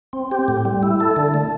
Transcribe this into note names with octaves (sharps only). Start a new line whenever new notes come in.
C4
G4
A2
G3
E4
A4
D3
A3